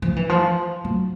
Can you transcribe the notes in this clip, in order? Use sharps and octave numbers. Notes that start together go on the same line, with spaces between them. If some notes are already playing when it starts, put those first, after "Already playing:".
F3
E3
F3
F#3